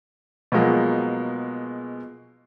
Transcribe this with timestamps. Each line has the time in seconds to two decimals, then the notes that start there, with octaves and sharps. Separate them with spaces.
0.52 B2 F3 F#3 G#3 A#3